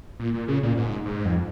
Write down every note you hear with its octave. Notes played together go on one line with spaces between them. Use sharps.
A#2
A#2
C#3
A#2
G#2
G#2
F2